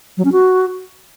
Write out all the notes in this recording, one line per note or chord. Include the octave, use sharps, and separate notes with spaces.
F#3
C#4
F#4